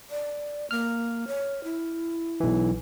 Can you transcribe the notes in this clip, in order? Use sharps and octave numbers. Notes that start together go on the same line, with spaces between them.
D5
A#3 F6
C#5
E4
B1 E3